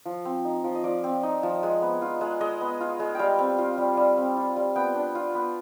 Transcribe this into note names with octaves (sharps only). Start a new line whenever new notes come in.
F3
C4
D#4
F3
D#5
F3 D5
C4
D#4
F3
G#3
B3
F4
G#3
G#3 D#5
B3
F4
G#3
G3 F5 G5
C4
F4
G3
G3
C4
F4
G3
B3 G5
D4
F4
B3